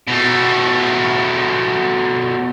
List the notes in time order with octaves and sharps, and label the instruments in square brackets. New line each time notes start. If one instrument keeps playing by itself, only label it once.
[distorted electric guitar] B2 A3